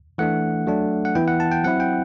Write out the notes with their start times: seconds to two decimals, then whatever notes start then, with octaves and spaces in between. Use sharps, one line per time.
0.18 E3 A3 D4 F#5
0.67 F#3 A3 D4
1.05 F#5
1.15 E3 B3 E4 G5
1.28 F#5
1.40 A5
1.52 G5
1.64 F#3 C4 E4 F#5
1.80 G5